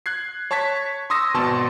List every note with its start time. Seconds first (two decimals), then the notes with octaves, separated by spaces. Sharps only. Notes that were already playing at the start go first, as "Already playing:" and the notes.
0.06 F#6 G#6 C7
0.51 C#5 A5 C#6 G#6 B6
1.10 C6 C#6 D#6 E6 A#6
1.34 G#1 B2 A5 C6